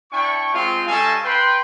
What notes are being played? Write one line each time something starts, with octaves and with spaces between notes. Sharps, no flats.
D4 E4 G5 C#6
G#3 C4 F4
G3 C#4 A4 D#5 F5 G#5
B4 G5 C6